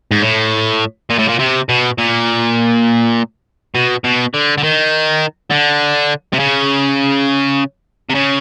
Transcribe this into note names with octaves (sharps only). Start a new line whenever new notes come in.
G#2
A2
A#2
A2
A#2
C3
B2
A#2
B2
B2
D3
D3
D#3
D3
C3
C#3
C3
C#3